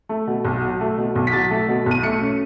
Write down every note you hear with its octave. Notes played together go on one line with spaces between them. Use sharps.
A3
B2
B1
F#3
A3
B2
B1
B6
F#3 A6
A3
B2
B1 D#7
A3 C#7
C#4